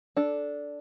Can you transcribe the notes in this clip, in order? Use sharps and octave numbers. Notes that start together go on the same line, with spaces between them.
D4 A4